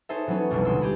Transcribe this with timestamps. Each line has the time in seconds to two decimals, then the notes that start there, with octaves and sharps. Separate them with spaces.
0.09 D#4 G#4 A4 C5 C#5 E5
0.27 E3 F#3 A3 B3 C#4 D#4
0.50 F1 B1 B2 G3 F#4
0.65 D2 G#3 C6 E6
0.81 G4 G#4 B5